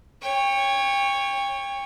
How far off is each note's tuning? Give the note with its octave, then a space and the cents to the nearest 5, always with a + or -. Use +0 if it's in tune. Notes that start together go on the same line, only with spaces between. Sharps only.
C#5 +0 G5 +30